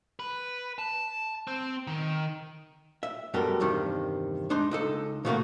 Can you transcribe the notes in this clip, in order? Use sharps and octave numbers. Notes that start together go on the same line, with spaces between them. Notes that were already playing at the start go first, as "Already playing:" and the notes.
B4
A5
C4
D#3
E5
F#2 G3 B3 G4 A4 A#4
E2 G2 C3 D#3
G#3 D4 D#4 C6
C#2 D#4 A4
C#3 E3 A3 A#3 F4 F#4